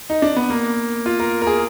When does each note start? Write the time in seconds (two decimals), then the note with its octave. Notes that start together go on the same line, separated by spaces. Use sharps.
0.10 D#4
0.22 D4
0.36 B3
0.50 A#3
1.06 F4
1.19 A#4
1.42 A#4
1.47 G#4